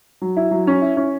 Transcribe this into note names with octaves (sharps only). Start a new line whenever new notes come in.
F#3
E4
F#3
C#4
E4
C#4